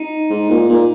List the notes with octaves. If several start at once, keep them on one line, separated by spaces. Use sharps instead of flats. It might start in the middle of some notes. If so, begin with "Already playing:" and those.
Already playing: D#4
G#2
A#2
A#2